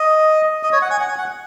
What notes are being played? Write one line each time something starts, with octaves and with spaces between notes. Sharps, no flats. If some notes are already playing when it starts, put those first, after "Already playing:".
Already playing: D#5
D#5
C#5
F#5
G#5
F#5
G#5
F#5